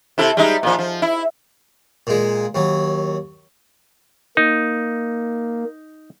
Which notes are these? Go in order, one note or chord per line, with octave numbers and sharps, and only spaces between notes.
C3 E4 A4
G3 G#3 D#4
A#2 F3
F3
E4
A#2 G#3
D#2 F#3
A#3 D#4